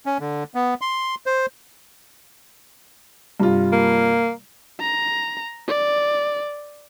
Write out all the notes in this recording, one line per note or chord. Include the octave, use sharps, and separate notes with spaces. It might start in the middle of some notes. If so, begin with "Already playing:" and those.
C#4
D3
B3
C6
C5
G2 C3 F4
A#3
A#5
D5